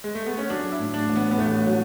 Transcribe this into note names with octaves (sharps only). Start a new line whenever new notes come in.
G#3
A3
B3
C#4
F#3 D4
E4
A2
D4
A1
B3
B3
A1 A3
F#3